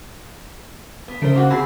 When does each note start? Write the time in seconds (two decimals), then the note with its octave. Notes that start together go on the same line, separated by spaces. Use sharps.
1.08 B3
1.22 C#3 A3 A#4 C5
1.35 A#3 F#4
1.50 C4 G#4 A5 B5